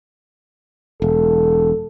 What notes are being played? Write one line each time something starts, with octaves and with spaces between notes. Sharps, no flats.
E1 A4